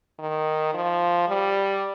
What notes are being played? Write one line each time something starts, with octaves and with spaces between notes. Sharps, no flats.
D#3
F3
G3